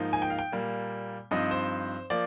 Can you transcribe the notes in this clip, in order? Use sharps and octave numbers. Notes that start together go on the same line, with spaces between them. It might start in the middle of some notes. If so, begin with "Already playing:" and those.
Already playing: G#2 F3 A#3 D#4
G#5
G5
F5
G5
A#2 G3 A#3
G2 F3 C4 D#4 D#5
C5
F3 A#3 D5